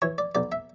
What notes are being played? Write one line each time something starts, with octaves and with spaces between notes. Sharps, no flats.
E3 C#5
D5
B1 D5
E5